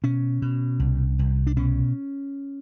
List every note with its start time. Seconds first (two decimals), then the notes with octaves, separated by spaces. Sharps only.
0.04 B2 C#4
0.42 B2
0.79 C2
1.19 C2
1.47 D4
1.56 B2 C#4